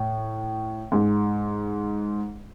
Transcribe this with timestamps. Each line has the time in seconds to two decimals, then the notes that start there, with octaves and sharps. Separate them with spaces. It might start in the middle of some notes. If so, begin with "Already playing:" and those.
Already playing: A2
0.92 G#2